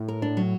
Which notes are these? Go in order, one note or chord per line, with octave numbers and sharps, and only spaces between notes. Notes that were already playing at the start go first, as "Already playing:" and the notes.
Already playing: A2
A#4
D4
F#3